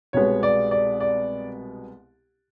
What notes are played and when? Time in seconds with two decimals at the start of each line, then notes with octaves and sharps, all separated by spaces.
0.13 C2 B2 G#3 B3 C#5
0.43 D5
0.71 D5
1.00 D5